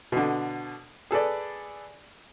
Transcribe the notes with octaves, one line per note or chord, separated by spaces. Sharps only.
B2 D3
G#4 A4 B4 D5